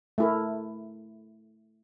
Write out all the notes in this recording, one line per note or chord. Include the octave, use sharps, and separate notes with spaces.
A3 E4 A#4